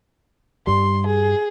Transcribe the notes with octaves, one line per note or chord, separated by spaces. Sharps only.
G2 G3 C6
G#4